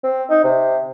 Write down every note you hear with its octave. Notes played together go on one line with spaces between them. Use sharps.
C4
D#4
C3